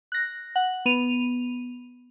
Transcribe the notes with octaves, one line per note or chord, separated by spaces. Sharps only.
F#6 A#6
F#5
B3 D#7 F7